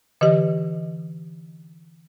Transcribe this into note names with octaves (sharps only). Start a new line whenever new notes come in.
D3 E3 G4 D#5